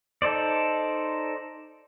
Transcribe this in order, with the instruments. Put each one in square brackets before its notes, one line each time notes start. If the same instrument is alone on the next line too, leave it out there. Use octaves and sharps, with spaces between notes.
[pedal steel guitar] D#4 A4 C5 D5